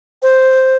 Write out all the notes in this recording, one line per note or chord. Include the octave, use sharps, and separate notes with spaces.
C5